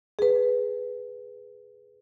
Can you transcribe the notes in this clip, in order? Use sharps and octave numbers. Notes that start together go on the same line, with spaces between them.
G#4 B4